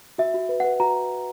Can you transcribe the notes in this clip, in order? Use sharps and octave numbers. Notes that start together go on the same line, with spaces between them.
F#4 E5
F#4
B4
B4 F#5
F#4 A#5